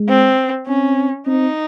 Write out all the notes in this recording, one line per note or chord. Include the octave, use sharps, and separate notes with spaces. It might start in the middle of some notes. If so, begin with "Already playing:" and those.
Already playing: G#3
C4
C4 C#4
C4 D#4